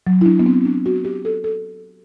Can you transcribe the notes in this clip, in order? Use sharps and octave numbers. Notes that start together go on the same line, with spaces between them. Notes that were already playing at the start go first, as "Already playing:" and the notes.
F#3
E4
D4
B3
C4
D4
F#4
G4
A4
A4